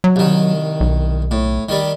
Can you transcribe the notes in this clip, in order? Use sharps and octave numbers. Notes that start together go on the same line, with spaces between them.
F#3
C2 D#3
B1
A2
D#3 G3